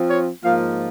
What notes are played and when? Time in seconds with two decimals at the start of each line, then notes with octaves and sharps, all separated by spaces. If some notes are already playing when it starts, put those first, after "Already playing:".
Already playing: F3 C4 F4
0.10 C#5
0.44 G#2 F3 A#3 F4 F5